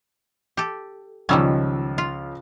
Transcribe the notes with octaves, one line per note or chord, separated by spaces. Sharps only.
G4 A4
C#2 D#3 F3 G3 C#4 E6
F4